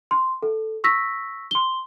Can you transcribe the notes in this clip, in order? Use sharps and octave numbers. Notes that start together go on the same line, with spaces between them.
C6
A4
C#6 E6 A#6 B6
C6 G7